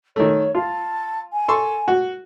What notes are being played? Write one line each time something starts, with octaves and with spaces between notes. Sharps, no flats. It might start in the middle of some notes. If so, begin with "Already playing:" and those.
D#3 A3 C#5
F4 A5
G#5
A4 C6 C#6
F#4